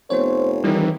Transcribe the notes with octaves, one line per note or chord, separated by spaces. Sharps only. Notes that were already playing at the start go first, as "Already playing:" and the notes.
F1 B3 C5 C#5
D#3 E3 G3 C4